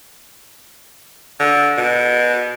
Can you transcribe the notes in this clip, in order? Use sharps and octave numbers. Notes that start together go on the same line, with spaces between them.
D3
B2